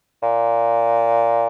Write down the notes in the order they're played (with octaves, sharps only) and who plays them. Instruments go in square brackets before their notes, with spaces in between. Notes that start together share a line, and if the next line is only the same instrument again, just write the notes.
[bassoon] A#2